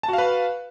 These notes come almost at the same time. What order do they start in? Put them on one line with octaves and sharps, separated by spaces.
A5 F#4 F5 B4